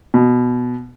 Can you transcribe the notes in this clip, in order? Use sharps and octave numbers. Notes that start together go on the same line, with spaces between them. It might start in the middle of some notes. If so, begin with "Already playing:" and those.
B2